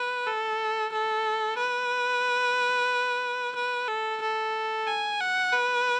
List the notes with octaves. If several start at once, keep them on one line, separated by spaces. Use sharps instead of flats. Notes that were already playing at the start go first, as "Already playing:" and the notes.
Already playing: B4
A4
A4
B4
B4
A4
A4
G#5
F#5
B4